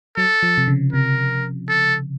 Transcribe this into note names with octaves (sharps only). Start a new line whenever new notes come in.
F#3 A4
F3
C3
C#3
C3 A#4
A4